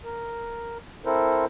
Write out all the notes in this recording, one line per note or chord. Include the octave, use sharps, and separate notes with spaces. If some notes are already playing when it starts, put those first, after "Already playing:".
A#4
C4 E4 A4 A#4 C5